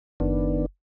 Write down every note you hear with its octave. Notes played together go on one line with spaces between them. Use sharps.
F#1 D#3 B3 D4